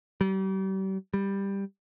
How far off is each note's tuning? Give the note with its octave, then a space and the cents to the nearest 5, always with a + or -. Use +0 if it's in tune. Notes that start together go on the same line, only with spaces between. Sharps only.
G3 -40
G3 +10